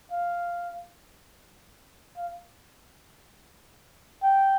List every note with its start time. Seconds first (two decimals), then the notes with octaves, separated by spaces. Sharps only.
0.12 F5
2.17 F5
4.23 G5